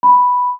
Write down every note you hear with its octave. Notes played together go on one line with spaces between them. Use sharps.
B5